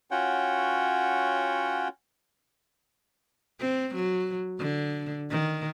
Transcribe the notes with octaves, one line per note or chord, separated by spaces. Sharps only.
C#4 F4 F#4 C#5 F#5 G5
C4
F#3
D3
D#3